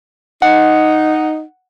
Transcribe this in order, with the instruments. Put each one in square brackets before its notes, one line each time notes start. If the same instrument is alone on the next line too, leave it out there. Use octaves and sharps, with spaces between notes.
[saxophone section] D#4 [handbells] F#5